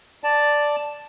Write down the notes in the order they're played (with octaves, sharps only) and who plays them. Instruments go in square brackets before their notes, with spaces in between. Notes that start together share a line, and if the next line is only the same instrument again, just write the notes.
[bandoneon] D5 A5